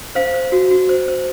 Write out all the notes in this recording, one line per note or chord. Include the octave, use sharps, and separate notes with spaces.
C5 F5
C5
F#4
F#4
C5
C5